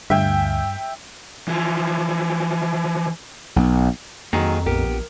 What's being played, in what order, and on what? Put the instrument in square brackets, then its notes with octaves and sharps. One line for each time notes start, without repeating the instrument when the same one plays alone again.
[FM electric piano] D2 F5 G#5 [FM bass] G2 [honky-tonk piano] E5 G5
[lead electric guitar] E3 F3
[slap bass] B1
[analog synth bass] F2 [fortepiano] D#3 F#3 [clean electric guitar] A#3 C4 G#4
[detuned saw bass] A#1 [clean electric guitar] B3 G4 [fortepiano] A#4